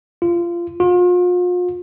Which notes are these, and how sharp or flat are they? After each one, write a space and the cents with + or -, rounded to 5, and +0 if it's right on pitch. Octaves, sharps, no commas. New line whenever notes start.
F4 -20
F4 +40